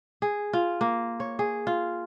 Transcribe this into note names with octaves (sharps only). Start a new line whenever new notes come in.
G#4
F4
A#3
C#5
G#4
F4